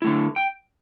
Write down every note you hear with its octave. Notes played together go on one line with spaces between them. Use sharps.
D3 A3 E4
G5